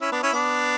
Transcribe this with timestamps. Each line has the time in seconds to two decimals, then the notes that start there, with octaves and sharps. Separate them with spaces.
0.01 C#4 E4
0.12 B3 D4
0.22 C#4 E4
0.33 B3 D4